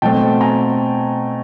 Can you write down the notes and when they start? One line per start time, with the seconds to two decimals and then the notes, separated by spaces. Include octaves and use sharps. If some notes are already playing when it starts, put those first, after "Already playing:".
0.02 B2 F#3 A3 C4 G5 A5
0.41 G#5 A#5